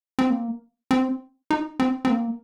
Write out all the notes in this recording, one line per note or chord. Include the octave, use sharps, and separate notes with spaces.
C4
A#3
C4
D#4
C4
C4
A#3